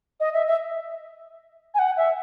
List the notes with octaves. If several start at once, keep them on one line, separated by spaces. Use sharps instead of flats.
D#5
E5
E5
G#5
F#5
E5